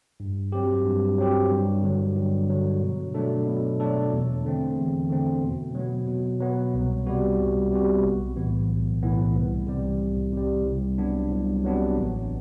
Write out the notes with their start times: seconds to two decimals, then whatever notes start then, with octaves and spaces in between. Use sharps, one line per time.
0.20 G2
0.52 F#3 C4 G4
0.85 G2
1.18 F#3 C4 G4
1.51 G2
1.83 D3 F#3
2.16 G2
2.49 D3 F#3
2.82 B2
3.14 F#3 A3 D4 A4
3.47 B2
3.80 F#3 A3 D4 A4
4.13 E2
4.45 D3 A3 C4
4.78 E2
5.10 D3 A3 C4
5.43 B2
5.75 F#3 B3
6.08 B2
6.40 F#3 B3
6.74 C2
7.06 C3 G3 B3 F#4
7.39 C2
7.71 C3 G3 B3 F#4
8.04 B1
8.36 A2 E3 B3
8.69 B1
9.03 A2 E3 B3
9.34 C2
9.67 C3 G3
10.00 C2
10.33 C3 G3
10.65 C2
10.98 C3 F#3 B3 D4
11.30 C2
11.64 C3 F#3 B3 D4
11.96 A1